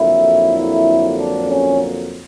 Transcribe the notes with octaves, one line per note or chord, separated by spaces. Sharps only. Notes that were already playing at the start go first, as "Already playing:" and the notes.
Already playing: F2 D3 F#3 A#3 E4
D4
C#4